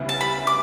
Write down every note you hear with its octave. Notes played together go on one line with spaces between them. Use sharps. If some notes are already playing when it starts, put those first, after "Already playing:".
Already playing: D2 C#3 G3 B3 E4
A5
B5
D6